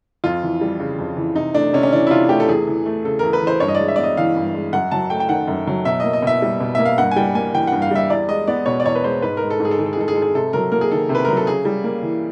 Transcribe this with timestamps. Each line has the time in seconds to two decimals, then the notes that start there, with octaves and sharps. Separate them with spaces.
0.24 F2 F4
0.43 E3
0.61 G3
0.80 C#3
0.99 F2
1.17 E3
1.36 C3 D#4
1.54 A3 D4
1.73 C3 C#4
1.83 C#4
1.92 E3 D4
2.07 E4
2.10 C3 F4
2.29 A3 G4
2.40 A4
2.48 E2 G#4
2.67 E3
2.86 A3
3.04 C#3 A4
3.19 E2 A#4
3.33 B4
3.42 E3
3.47 C5
3.60 G2 C#5
3.68 D#5
3.75 G#3 D5
3.88 E5
3.96 B3 D5
4.03 D#5
4.17 E3 F5
4.36 G2
4.54 G#3
4.73 F#2 F#5
4.91 F#3 A5
5.10 A3 G5
5.20 G5
5.29 D#3 F#5
5.48 F#2
5.67 F#3
5.85 B2 E5
6.00 A#3 D#5
6.13 D#5
6.23 B2 E5
6.42 G3
6.61 B2
6.75 A#3 E5
6.85 F5
6.98 G2 F#5
7.11 G#5
7.16 G3 G5
7.35 A#3 G#5
7.54 E3 G5
7.67 G2 F#5
7.82 F5
7.91 G3 E5
8.10 E2 D5
8.28 G#3 D#5
8.47 B3 D5
8.66 B2 C#5
8.80 D5
8.85 E2 C#5
8.95 B4
9.04 G#3 C5
9.22 G#2 B4
9.37 G#3 A#4
9.50 A4
9.60 G#2
9.65 G#4
9.71 A4
9.79 D#3 G#4
9.86 A4
9.93 G#4
9.97 G#2 A4
10.08 G#4
10.15 G#3 A4
10.22 G#4
10.34 C3 A4
10.53 F#3 A#4
10.72 A#3 A#4
10.81 G#4
10.91 D#3 A4
11.09 C3
11.15 B4
11.25 F#3 A#4
11.37 A4
11.47 C#3 G#4
11.65 G3
11.84 A#3
12.03 E3